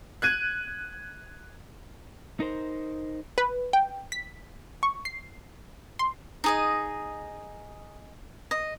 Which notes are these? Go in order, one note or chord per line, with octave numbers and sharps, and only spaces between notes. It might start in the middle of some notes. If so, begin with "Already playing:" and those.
F#6 G#6 D#7
D#4 A#4 C5
B4
G5
B6
C#6
C7
C6
D#4 G#4 D#5
D#5